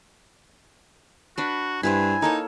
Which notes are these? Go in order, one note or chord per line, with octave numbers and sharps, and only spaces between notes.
D4 F#4 B4
G2 E4 B4 C5 G#5
A#3 D#4 A4 C#5